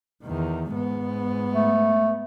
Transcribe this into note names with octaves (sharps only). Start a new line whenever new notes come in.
E2 D#3
G#2 B3
A3